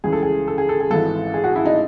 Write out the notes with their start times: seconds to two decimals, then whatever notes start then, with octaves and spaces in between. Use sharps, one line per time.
0.04 C#2 C#3 E3 G#4
0.12 A4
0.23 G#4
0.48 A4
0.58 G#4
0.69 A4
0.80 G#4
0.90 G#1 G#2 E3 A4
1.34 G#4
1.44 F#4
1.56 E4
1.65 D#4